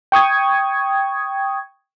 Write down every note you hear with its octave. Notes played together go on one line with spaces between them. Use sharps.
G5 C#6 D#6 G#6